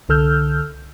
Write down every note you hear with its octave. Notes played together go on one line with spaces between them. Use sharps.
C2 D3 A4 E6 F6 G6